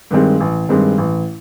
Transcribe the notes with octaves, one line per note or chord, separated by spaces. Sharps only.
G2 D#3 G#3 C4
A1
G2 D#3 G#3 C4
A1